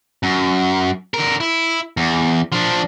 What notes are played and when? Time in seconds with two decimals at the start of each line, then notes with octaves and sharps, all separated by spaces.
0.23 F#2
1.14 D3 A#4
1.40 E4
1.97 E2
2.52 F3 D4